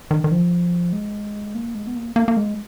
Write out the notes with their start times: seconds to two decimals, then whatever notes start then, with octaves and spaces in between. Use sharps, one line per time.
0.11 D#3
0.24 D#3
0.32 F3
0.93 G#3
1.55 A#3
1.75 G#3
1.87 B3
1.96 A#3
2.16 A#3
2.28 A#3
2.37 G#3